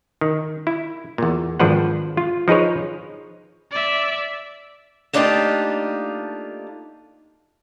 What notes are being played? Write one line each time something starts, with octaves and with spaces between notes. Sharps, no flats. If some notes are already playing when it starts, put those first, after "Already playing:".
D#3
E4
E2 A#2
G#1 F3 D4 B4 C5 F#5
F4
F3 D#4 G#4 B4 C#5
D5 E5
A3 A#3 D4 D#4 F4 G4